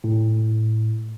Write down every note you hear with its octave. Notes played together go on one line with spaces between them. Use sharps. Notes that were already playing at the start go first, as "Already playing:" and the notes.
A2